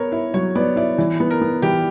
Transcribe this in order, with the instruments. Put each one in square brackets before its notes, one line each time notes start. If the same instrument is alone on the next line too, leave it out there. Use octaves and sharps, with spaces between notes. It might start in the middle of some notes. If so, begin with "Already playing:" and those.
Already playing: [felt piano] B3 A#4 [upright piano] C#5
[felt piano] E4
[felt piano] F#3 [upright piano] C#5
[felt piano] B3 [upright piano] D5
[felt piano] E4 [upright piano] D5
[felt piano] E3
B3
[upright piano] A#4
[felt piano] B3
[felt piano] E3 [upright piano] G4